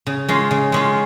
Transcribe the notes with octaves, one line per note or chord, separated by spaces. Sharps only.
C#3
G#3 C#4 F4
C#3
G#3 C#4 F4